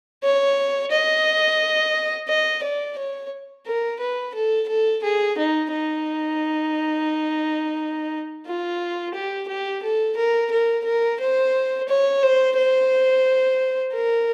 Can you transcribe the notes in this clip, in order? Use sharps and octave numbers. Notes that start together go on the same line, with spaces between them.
C#5
D#5
D#5
D5
C#5
A#4
B4
A4
A4
G#4
D#4
D#4
F4
G4
G4
A4
A#4
A#4
A#4
C5
C#5
C5
C5
A#4